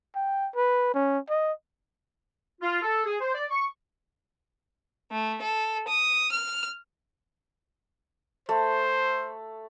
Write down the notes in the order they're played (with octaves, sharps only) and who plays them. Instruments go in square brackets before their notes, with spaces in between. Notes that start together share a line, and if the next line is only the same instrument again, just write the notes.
[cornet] G5
B4
C#4
D#5
[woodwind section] F4
A4
G#4
C5
D5
C#6
[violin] A3
A4
D#6
F6
[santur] A3 [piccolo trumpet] C5